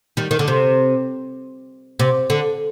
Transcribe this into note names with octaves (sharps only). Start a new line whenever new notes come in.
D#3 G3
D#3
D3
C3
C3
D3